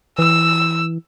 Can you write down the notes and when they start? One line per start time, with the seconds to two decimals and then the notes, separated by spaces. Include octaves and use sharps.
0.19 E3 E6